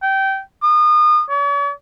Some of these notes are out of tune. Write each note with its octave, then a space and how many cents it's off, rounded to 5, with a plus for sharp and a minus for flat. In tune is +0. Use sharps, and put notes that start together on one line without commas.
G5 -20
D#6 -35
C#5 +45